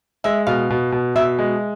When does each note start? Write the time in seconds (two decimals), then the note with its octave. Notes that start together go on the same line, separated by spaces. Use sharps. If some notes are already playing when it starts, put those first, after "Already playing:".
0.24 G#3 E5
0.47 B2 F5
0.70 B2
0.92 B2
1.15 B2 E5
1.39 G#3